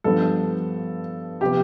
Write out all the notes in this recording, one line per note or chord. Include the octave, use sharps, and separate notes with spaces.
G2 F3 B3 A4
C3 F3 B3 G4